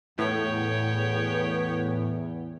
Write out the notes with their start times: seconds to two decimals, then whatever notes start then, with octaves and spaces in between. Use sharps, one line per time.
0.19 E2 A2 B3 C#5 G5